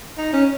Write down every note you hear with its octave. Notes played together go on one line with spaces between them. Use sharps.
D#4
C#4